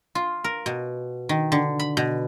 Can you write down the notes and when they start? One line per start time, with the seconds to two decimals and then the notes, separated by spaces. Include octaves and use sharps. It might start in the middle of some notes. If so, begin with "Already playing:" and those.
0.15 F4
0.44 A#4
0.66 B2
1.29 D#3
1.52 D3
1.79 B5
1.97 B2